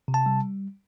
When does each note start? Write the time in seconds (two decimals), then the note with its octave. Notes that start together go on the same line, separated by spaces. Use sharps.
0.08 C3
0.14 A5
0.26 G3